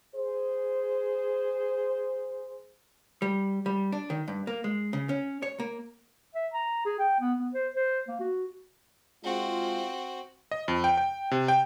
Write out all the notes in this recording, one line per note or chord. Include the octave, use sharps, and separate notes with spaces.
G#4 C5
G3
G3
D4
D#3
G2
A#3
G#3
C#3
C#4
C#5
A#3
E5
A#5
G#4
G5
B3
B3
C5
C5
A#3
F#4
G#3 C4 F4 F#4
D#5
F2
G5
G5
C3
G5